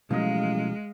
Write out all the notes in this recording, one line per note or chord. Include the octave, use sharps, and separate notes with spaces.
A1 B2 F3 F#3 G#3 D#5 F5